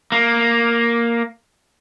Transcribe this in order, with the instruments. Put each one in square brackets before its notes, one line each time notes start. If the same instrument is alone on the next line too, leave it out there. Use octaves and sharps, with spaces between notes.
[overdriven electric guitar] A#3